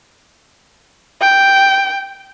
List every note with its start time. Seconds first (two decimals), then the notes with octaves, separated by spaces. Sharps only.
1.21 G5